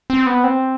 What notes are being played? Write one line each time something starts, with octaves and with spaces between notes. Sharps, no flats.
C4
B3
C4